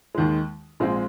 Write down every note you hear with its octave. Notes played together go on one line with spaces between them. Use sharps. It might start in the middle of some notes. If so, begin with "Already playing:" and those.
D#2 D#3 G#3
A#1 A#2 G#3 C4